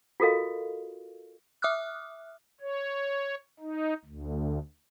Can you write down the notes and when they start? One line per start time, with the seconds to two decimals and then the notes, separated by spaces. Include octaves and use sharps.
0.20 F4 F#4 A4 A#4 D#5 F5
1.62 E5 D6 D#6 F6 F#6
2.60 C#5
3.60 D#4
4.05 D2